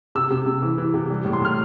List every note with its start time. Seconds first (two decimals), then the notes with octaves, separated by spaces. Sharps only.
0.15 C3 E6
0.30 C3
0.46 C3
0.62 E3
0.78 E3
0.94 C3
1.10 G3
1.25 A2
1.33 C6
1.41 A2 F6